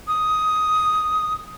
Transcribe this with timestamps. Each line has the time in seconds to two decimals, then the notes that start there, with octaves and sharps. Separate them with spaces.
0.08 D#6